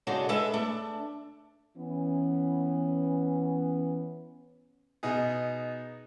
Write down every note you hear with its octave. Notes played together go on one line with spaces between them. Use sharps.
C#3 G#3 D4 D#4 F#4 A4
G#3 D4 A4 B4 E5 F5
A3 D4
E3 B3 C#4
B2 B3 D#4 G#4